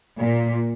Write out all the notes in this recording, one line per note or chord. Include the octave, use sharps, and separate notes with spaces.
A#2